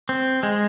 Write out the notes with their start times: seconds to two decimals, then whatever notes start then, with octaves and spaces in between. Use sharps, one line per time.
0.09 C4
0.43 G#3